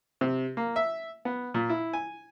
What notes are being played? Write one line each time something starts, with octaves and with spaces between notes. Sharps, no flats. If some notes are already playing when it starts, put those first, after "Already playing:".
C3
A#3
E5
B3
A#2
E4
G#5